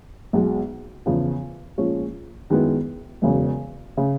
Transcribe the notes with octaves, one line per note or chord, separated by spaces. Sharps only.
B1 B2 G#3
E2 C#3 F3
A#2 F3 G#3 C#4
F#2 D#3 G#3 B3 E4
E1 E2 C#3 F#3
C#3